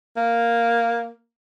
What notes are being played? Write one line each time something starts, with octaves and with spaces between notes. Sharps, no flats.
A#3